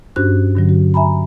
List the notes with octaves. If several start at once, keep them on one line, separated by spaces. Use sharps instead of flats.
G2 C#4 D4 F#4 C5 F#6
G2 D3 F#3
F#4
E5 G#5 A#5 B5